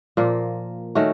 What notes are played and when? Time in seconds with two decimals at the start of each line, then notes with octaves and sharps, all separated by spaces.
0.17 A#2 F3 A#3
0.95 D#3 A3 C#4 F#4